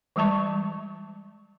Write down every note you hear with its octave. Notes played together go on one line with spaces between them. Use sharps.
E3 G3 G#3 A5 C#6